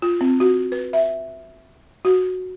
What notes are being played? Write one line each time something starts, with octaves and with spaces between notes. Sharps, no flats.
F4
C4
F#4
B4
E5
F#4